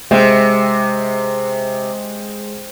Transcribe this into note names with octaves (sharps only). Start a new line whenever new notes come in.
C3 G#3 C5